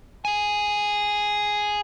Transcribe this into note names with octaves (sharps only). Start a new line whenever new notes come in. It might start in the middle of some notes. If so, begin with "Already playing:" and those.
G#4 G#5